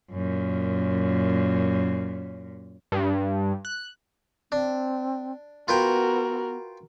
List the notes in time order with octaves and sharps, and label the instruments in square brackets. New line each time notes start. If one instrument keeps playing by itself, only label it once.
[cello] F#2 A#2
[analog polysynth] G2
F#6
[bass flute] C4 [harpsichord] D4
[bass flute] B3 [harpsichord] F4 B4 G5 [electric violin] F#4 A#4